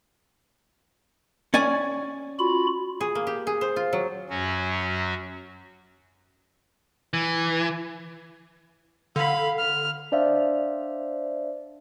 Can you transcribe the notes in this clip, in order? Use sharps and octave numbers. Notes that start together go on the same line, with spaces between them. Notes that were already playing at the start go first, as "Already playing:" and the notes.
C#4 D5 G#5
F4 F#4 B5
G#4
A#3
G4
G#4
C5
F4
F#3
F#2 F#3 C#4 F#4
E3
D3 F5 B5
F6
D4 C5 D5 E5 F5